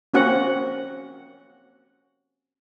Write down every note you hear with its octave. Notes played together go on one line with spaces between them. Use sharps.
A#3 C4 C#4 F#4 F#5